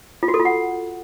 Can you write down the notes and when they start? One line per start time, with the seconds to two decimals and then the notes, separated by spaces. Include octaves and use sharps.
0.23 F4
0.28 F#4
0.34 A4
0.40 F4
0.45 F#5